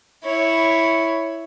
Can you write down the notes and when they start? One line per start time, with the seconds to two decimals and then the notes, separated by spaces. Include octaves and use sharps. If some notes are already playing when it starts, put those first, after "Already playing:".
0.24 E4 C#5